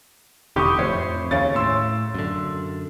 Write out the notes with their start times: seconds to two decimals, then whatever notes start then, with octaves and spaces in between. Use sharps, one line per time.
0.56 E1 D3 G4 B5 C#6 D#6
0.78 F2 A2 C5 C#5
1.31 D#2 C#3 C#4 A6
1.55 A2 C6 E6
2.14 F#2 D3